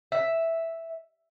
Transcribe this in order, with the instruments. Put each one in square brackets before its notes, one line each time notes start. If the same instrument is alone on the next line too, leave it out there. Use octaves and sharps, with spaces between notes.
[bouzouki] E5